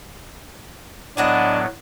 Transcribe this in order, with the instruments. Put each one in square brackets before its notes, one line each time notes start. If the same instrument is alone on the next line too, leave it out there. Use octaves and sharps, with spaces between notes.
[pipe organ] A2 F#3 B3 [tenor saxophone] D4 [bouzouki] D#5 F#5 G#5